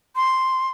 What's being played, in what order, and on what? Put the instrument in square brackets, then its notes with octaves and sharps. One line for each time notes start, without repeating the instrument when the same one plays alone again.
[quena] C6